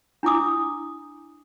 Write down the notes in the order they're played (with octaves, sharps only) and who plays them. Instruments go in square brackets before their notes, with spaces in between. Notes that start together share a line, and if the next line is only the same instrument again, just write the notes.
[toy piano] D4 E4 G#5 D6 D#6